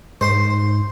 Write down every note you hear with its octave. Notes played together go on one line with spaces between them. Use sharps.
G#2 C5 C6